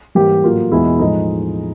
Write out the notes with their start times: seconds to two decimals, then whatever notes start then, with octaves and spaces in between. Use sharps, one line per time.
0.15 G#2 E3 G3 A#3 G4
0.44 A2 F#3 A#3 F4
0.72 E2 B2 G#3 E4
0.99 A2 F3 G#3 D#4